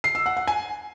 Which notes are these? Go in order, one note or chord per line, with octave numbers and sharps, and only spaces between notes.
C7
E6
F#5
F#5
G#5